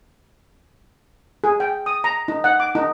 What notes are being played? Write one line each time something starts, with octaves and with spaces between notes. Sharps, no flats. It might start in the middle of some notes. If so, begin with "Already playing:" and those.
G#4
G5
D#6
A#5
D#4
F#5
D6
D#4